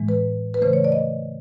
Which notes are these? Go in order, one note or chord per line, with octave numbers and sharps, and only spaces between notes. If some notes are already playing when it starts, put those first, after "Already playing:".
Already playing: A2 E3 G#3
B4
B4
C#3 E3 A3 C5
C#5
D5
D#5